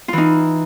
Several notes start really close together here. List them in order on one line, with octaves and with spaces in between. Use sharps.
F4 E3 D#4